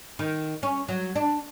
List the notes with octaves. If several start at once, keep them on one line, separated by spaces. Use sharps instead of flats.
D#3
C#4
F#3
D4